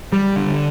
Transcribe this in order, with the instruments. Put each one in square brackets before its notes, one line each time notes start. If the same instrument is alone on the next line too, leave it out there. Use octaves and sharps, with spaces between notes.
[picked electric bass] G3
D3